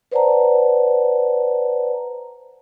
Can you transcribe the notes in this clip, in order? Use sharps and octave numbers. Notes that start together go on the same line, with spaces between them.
B4 C5 D5 F#5 A5 A#5